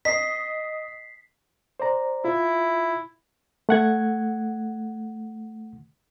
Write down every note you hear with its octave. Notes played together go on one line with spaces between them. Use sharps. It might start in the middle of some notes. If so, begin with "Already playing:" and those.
D#5 B6 C7
C5 D5 A#5
E4 F4
A3 F#5 G#6